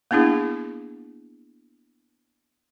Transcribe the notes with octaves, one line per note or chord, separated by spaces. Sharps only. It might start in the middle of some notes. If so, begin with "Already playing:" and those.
A#3 B3 D4 E4 G#4